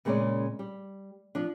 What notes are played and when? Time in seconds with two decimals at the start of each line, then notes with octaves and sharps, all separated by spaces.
0.05 A#2 C#3 G#3 C4 C#4 D5
0.59 G3
1.35 F3 D4